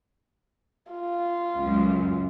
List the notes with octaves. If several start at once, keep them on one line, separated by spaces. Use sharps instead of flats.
F4
C#2 F#2